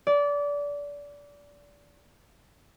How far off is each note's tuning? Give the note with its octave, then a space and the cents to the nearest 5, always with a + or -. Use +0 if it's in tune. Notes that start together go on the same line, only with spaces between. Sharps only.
D5 -25